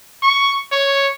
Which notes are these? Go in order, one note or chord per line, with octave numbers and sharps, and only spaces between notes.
C#6
C#5